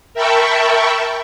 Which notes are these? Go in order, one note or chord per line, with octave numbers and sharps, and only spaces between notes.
A#4 E5 G5 A5 B5 C#6